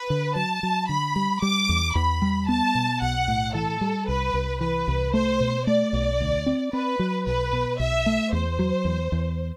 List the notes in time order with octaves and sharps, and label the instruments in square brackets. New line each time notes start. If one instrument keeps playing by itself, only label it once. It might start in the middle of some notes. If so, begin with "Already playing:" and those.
Already playing: [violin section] B4
[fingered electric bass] D3
[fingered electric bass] F#3 [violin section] A5
[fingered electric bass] F#3
[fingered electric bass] D3 [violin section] B5
[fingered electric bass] G3
[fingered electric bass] G3 [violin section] D6
[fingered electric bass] E2
[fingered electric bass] E2 [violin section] B5
[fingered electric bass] G3
[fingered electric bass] B3 [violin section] A5
[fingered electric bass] B2
[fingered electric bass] B1 [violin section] F#5
[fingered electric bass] A2
[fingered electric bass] E3 [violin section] A4
[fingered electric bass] G3
[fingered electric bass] C2 [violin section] B4
[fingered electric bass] C2
[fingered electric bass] E3 [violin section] B4
[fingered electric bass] C2
[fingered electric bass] A3 [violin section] C5
[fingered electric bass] B2
[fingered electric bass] A3 [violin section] D5
[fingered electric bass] B1
D2
C4
[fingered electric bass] C4 [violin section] B4
[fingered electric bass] F#3
[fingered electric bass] B1 [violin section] B4
[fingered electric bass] B2
[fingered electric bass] B1 [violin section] E5
[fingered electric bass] A3
[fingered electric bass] E2 [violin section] C5
[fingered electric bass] F#3
E2
E2